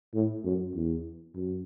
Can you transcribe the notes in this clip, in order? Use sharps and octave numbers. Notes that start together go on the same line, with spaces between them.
A2
F#2
E2
F#2